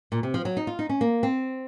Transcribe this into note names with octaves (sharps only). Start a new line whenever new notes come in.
A#2
C3
F3
F#3
D#4
F4
D#4
C#4
A#3
C4